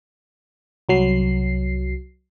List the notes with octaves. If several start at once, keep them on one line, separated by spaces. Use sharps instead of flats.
C2 F#3 C7